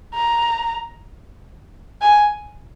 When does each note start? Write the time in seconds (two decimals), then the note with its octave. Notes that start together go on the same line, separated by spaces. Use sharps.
0.15 A#5
2.02 G#5